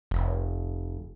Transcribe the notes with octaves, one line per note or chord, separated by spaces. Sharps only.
F1